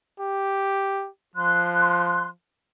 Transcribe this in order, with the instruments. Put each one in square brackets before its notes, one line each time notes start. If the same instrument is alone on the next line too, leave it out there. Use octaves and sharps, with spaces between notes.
[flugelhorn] G4
[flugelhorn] F3 [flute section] C6 F#6